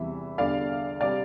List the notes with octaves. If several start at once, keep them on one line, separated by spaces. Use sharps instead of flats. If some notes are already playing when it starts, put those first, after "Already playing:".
Already playing: E2 C3 E3 G3 E5
E2 D3 G3 D5 F5
C3 G3 D5 F5